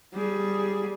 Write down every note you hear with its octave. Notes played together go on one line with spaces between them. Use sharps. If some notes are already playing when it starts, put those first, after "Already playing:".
G3 G#4